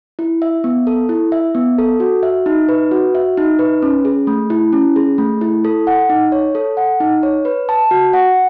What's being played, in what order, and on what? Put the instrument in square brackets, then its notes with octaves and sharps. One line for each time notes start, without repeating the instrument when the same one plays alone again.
[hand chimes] E4
E5
B3
A4
E4
E5
B3
A4
F#4
E5
D#4
B4
F#4
E5
D#4
B4
C#4
G#4
A3
E4
C#4
G#4
A3
E4
A4
F#5
D#4
C#5
A4
F#5
D#4
C#5
B4
A5
F#4
F#5